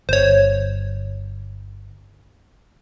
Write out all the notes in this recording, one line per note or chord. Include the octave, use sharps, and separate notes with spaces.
G1 C5 C#5